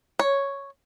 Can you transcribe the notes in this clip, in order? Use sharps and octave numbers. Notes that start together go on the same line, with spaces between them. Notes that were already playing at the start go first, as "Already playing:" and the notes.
C#5